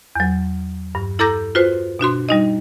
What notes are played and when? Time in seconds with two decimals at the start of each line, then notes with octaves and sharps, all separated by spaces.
0.15 E2 F#3
0.95 G2
1.19 E4 A4 A#5 D6 G6 A#6
1.55 F4 F#4 B4 C5
1.99 B2 D4 F#4 C6
2.29 G3 D#4 D#5